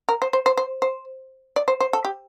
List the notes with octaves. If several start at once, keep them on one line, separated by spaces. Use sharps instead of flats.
A#4
C5
C5
C5
C5
C5
D5
C5
C5
A4
G4